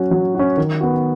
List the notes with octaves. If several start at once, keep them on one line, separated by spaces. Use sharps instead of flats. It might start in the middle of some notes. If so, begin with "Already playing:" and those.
Already playing: F#3 C#4 F#4
F#3
C#4 F#4
D#3
B3 F#4